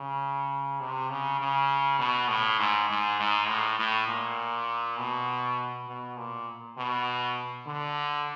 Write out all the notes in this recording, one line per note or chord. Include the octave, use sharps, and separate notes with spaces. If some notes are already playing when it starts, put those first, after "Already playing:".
Already playing: C#3
C3
C#3
C#3
B2
A2
G#2
G#2
G#2
A2
A2
A#2
B2
B2
A#2
B2
D3